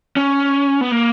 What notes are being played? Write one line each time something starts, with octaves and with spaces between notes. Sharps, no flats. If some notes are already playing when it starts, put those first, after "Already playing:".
C#4
B3
A#3